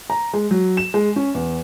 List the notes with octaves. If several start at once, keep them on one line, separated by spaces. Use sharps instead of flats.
A#5
G#3
F#3
E7
G#3
C#4
E2